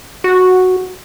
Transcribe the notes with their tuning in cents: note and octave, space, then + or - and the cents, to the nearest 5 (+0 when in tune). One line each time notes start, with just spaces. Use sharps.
F#4 -5